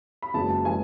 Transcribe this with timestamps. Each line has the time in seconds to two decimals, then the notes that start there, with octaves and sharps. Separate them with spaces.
0.22 B5
0.34 F#1 F#2 E3 G#3 A5
0.49 A5
0.65 E3 G#3 G#5